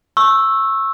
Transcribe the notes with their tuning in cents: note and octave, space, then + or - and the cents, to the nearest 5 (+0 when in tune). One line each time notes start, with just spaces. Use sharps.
C#6 -25 E6 +0